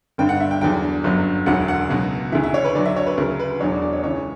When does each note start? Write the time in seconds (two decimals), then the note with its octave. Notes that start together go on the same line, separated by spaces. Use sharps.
0.18 G1 G2 D3 G5
0.29 F#5
0.40 E5
0.51 G5
0.61 E2 D3 F#3 G5
1.04 G1 F#2 D3 F#3
1.46 E1 D2 D3 F#3 F#5
1.68 F#5
1.89 C#2 B2 F#3
2.32 D2 C#3 E3 E5
2.43 E5
2.54 C#5
2.65 B4
2.74 D2 D3 F#3 D5
2.86 E5
2.96 C#5
3.06 B4
3.18 D2 C#3 F#3 A#4
3.40 B4
3.60 E1 E2 D3 F#3 C#5
3.71 D5
3.82 D5
3.93 C#5
4.03 C#2 C#3 E3 C#5